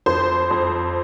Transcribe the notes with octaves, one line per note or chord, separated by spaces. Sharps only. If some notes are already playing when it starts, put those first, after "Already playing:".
F2 C5
F2